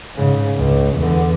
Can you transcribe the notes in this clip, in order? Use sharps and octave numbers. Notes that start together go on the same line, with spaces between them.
G#2 C#3
C#2
E2 D3